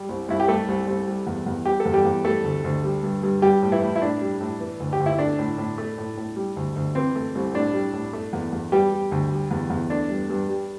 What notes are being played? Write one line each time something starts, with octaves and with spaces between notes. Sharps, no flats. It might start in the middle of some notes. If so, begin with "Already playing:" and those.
Already playing: G3
C2
C2 E4
G4
G3 A3 A4
C2
C2
G3
E2
E2
G3 G4
A4
E2
G3 G4
E2
G3 A3 A4
D2
D2
G3
G2
G2
G3 G4
A2
E3 E4
A2
E4
A2 D4
G3
A2
E3
D2
G4
D2
E4
A3 D4
A2
A2
A3
A2
A2
G3
D2
D2
E3 C4
A3
C2
A2 D4
G3
A2
A3
E2
E2
E3 G3 G4
G3
D2
G3
E2
E2
A3 D4
G2
G2
G3